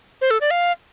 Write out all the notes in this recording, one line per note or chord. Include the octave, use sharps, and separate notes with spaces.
C5
A4
D5
F5